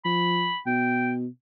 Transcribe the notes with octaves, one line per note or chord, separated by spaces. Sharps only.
F3 B5
B2 G5